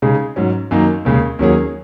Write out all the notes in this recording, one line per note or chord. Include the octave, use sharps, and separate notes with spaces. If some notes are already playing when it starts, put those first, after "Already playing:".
C#3 G#3 D#4 G#4
G#2 F#3 C#4
F#2 D#3 A#3 D#4
D#2 C#3 G#3
D#2 D#3 F#3 C#4 G#4